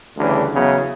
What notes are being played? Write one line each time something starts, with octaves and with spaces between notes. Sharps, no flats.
D2 C#3 E3 G3 D4
E2 C#3 F#3 B3 E4